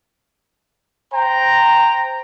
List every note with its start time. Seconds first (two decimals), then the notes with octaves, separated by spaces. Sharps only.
1.13 C5 G5 A#5